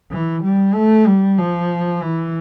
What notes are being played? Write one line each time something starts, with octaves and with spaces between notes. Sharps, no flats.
E3
G3
A3
G3
F3
E3